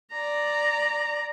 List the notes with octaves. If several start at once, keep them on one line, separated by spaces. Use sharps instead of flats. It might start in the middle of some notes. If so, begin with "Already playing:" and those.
D5 A#5